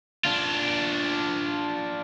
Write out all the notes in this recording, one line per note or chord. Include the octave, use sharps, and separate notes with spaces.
D4 F4